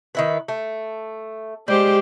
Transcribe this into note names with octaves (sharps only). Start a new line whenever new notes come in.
D#3 E4 B4
A3
G3 G#3 G4 C5